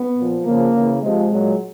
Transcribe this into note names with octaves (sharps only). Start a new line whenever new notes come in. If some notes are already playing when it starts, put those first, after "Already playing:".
Already playing: B3
A#2 F3
C#3 F3 A#3
C#3 E3
C3 F3 G#3
A#2 F#3